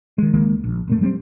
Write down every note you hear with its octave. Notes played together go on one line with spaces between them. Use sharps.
D#3 G#3
C#2 D#3 G#3 A#3
A#1
F1 A#2 A3
F#3 G3 A#3 C4